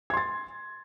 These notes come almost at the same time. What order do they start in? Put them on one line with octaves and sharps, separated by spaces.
G#6 C6 A6